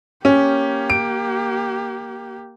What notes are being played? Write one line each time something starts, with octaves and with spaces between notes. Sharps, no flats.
A#3 C#4 G4
D7